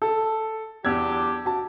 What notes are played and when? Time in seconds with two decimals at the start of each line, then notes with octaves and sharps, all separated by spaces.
0.02 A4
0.85 E2 F#3 D4 G4 E6 G#6
1.45 F#4 A5